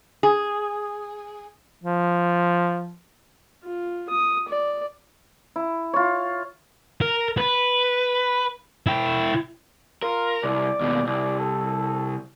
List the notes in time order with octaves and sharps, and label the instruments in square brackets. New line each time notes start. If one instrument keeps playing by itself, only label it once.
[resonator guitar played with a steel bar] G#4
[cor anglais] F3
[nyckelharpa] F4
D#6
D5
[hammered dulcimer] E4
F4 C#5
[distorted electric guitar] A#4
B4
E4 G5
[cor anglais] F4 [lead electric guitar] A#4
[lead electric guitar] C2 [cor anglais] D5
[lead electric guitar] D#2 B2
[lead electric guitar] C2 [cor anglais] D5
[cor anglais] A4